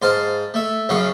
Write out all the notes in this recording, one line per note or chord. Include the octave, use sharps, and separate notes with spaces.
G#2 C5 F5 A5
A3 E5
F#2 C#3 F#3 F5 C#6